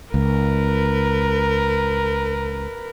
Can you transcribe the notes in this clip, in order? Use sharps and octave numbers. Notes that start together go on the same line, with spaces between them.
C#2 A#4 B4